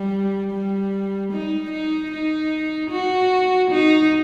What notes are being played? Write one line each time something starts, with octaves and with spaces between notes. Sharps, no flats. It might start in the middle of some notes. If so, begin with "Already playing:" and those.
Already playing: G3
G3
D#4
D#4
D#4
F#4
D#4